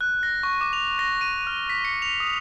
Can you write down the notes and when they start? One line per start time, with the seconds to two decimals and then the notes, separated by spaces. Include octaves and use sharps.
0.01 F#6
0.23 A#6
0.43 C#6
0.61 D6
0.73 F7
0.99 A#6
1.21 D#7
1.47 F6
1.69 B6
1.85 C#7
2.02 F7
2.20 D#6